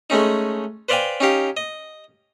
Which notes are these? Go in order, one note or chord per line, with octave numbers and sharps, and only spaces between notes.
G#3 A3 C#4 D#4
B4 C5 D5 F5 G5 G#5
C#4 D#4 G4 F5
D#5